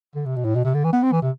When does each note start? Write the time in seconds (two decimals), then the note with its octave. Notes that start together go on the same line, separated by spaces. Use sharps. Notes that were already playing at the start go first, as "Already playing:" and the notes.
0.15 D3
0.25 C3
0.36 B2
0.44 A2
0.55 B2
0.65 C3
0.74 D3
0.84 E3
0.93 B3
1.03 C4
1.12 E3
1.22 C3